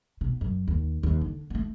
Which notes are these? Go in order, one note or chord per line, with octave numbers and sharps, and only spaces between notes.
B2
F#2
D#2
D#2
D3
A3 A#3